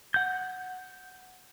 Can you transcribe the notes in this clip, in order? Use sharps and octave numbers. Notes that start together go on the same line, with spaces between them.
F#5 G6